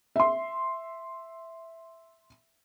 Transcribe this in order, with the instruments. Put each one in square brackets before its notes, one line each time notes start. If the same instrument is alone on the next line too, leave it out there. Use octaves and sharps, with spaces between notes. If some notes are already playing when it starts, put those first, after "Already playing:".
[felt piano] E5 C6